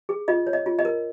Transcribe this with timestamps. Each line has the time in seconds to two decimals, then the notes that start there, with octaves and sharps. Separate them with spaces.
0.09 G#4
0.28 F4 D#5
0.47 C#5
0.53 D#5
0.66 F4
0.79 D#5
0.85 A#4